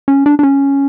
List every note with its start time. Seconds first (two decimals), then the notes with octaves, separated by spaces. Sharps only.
0.08 C#4
0.26 D4
0.39 D4
0.43 C#4